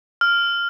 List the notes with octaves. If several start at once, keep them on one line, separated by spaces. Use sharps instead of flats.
F6